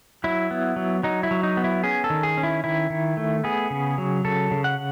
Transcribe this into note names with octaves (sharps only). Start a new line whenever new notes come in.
F#3 E4
B3
F#3
F#3 D#4
E4
F#3
D#4
B3
E4
C#4 G#4
A4
D#3
G#4
C#4
E4
D#3 E4
D#3
A3
B3 G#4
C#3
F#3
C#3 A4
C#3
F#5